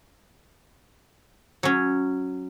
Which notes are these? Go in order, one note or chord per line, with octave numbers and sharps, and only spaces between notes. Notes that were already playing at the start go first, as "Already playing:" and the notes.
F#3 C#4